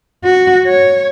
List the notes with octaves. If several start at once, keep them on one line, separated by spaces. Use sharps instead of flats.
F#4
C#5